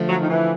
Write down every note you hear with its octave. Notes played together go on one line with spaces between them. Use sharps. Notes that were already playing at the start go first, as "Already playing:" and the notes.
Already playing: D3 F3 A3
F#3
D#3
E3